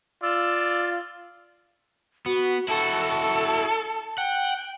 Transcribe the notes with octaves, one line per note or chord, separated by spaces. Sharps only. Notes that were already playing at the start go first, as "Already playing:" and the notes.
F4 D5 E6
B3 F#4
E4 F#4 A4 A5
A4
F#5 G5